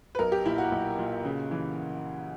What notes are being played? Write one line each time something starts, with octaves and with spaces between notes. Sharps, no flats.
B4
B1 A#4
G4
A#2 E4
F#4
B1
A#2
C#3
E3